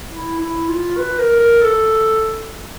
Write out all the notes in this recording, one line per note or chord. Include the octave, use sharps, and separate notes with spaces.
E4
E4
F4
B4
A#4
A#4
A4